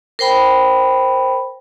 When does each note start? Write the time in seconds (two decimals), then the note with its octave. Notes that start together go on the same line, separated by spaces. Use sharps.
0.19 A#4 C5 G5 B5